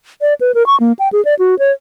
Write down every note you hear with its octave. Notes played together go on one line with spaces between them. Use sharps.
D5
B4
A#4
C#6
A#3
G5
G#4
D5
F#4
C#5